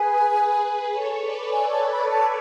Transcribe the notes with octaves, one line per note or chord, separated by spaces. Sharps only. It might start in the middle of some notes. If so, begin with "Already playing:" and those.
Already playing: G#4 B4 G#5
A4 C#5
B4 D5
B4 D5 G#5
A5
B4 D5
B5
A5